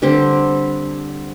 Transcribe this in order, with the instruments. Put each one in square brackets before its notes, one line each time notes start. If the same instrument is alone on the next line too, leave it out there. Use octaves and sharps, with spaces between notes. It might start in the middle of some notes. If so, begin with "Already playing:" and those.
[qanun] D3 G3 C4